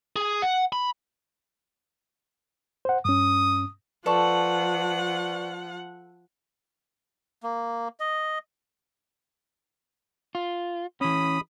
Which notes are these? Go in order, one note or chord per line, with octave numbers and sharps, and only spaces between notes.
G#4
F#5
B5
C5 F#5
G2 C#4 D#6
F3 A4 B4 D5 F#5 C#6
A#3
D#5
F4
E3 C#4 B5 D#6